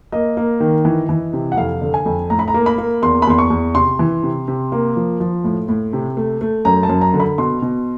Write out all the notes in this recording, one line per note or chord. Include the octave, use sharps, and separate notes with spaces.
A#3 D#5
A#3
D#3
E3
E3
C3
F#5
F2 F5
D3
G#5
F2
A2 A#5
B5
A#5
A#3
B5
A#3
E2 C6
B5
E2 C6
C#6
E2
C3 C6
E3
C3
C3
A#3
F3
F3
A2
A2
C3
A3
A3
F#2 A#5
A5
F#2
A#5
D3
B5
B2 C6
B2